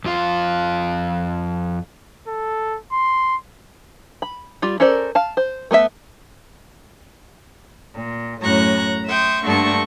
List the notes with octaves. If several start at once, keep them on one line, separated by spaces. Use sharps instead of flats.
F2 F4 F5
A4
C6
B5
G3 F4
C#4 A4 A#4 C5 D5
F5 A5
C5
A3 B3 A#4 E5
A#2
F#2 A2 A#5 C#6 F#6
E5 G5 C6 C#6 D#6
G2 D3 A3 A#3 A5 C#6